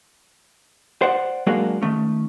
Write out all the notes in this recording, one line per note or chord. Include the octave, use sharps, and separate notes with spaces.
C5 D5 F#5
F#3 G#3 A#3 D4 F#4 G#4
D#3 A3 C#4